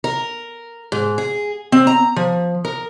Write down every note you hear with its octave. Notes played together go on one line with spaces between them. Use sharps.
A#4
G#2
G#4
C4
A#5
F3
A#4